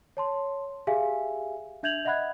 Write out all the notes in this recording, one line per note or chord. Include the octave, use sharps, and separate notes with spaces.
C#5 A5 C6
G4 G#4 E5 F5 G#5
D4 E5 G6 G#6 F7 F#7
D#5 E5 F#5 B5 F#6 G#6